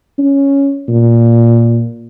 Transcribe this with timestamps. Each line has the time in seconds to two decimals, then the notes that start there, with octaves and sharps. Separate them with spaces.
0.18 C#4
0.88 A#2